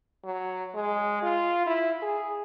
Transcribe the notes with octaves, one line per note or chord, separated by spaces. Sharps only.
F#3
G#3
F4
E4
G#4